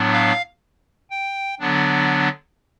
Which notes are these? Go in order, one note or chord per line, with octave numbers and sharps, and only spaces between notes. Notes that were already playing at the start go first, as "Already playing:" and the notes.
Already playing: A2 F#3 B3 D4
F5
G5
D3 F#3 B3 D4